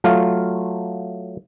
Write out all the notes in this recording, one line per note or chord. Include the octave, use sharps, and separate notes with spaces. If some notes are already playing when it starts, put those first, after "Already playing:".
F#3 A3 F4 F5